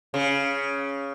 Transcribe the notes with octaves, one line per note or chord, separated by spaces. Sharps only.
C#3